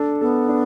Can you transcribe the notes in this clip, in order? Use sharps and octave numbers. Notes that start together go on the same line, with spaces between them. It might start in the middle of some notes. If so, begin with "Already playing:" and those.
Already playing: D4 A4
B3 A4
D4